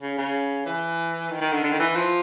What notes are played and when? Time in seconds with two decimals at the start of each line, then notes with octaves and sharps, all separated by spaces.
0.02 C#3
0.18 C#3
0.66 E3
1.31 D#3
1.41 D#3
1.52 D3
1.63 D3
1.72 D#3
1.79 E3
1.96 F3